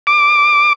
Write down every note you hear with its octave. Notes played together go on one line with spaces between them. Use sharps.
D6